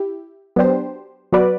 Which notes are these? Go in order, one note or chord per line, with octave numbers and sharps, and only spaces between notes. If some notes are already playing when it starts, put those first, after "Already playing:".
Already playing: E4 G4
F#3 B3 D4 G4 C5
F#3 B3 F#4 B4 D5